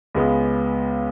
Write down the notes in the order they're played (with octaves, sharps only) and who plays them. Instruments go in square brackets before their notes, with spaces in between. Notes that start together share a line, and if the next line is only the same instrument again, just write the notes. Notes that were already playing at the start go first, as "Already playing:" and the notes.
[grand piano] C#2 C#3 G#3 B3